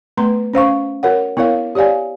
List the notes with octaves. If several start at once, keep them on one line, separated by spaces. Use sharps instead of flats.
A3 B3 B4 A#5 C6
C#4 C5 F5 C#6
F#4 A#4 C#5 F#5
B3 E4 A#4 C#5 F5
G4 C#5 D5 F5 G#5